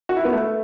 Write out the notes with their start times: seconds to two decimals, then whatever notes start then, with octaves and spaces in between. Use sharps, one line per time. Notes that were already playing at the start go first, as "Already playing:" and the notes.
0.09 F#4
0.16 E4
0.25 B3
0.33 A3